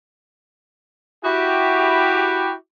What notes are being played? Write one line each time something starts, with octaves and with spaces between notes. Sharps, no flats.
E4 F#4 G4